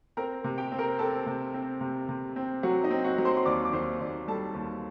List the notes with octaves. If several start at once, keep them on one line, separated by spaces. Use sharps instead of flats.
C4 A#4 A#5
C3
G4 G5
C4
A#4 A#5
C4 A4 A5
C3
C4
C3
C3
C4
F#3 F#4 F#5
D#4 D#5
C4
F#4 F#5
F#3
C5 C6
C6
D#2 D5 D6
D6
D#2 C5 C6
D#2 D5
G3 A4 A5
D#2